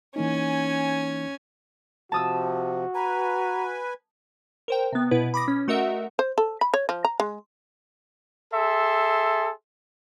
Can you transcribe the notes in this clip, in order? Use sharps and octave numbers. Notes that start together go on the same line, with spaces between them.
E3 A#3 C#4 D#4 G#5
C3 F3 F#4 A5 D#6 E6
B4 G#5 A#5
A#4 C5 G5
C3 B3
B2 E4 B4
B5 D6 D#6 A#6
C#4
A3 F#4 A#4 D#5 E5 F#5
C5
A4
B5
C#5
F3
A#5
G#3
G#4 A4 E5 C6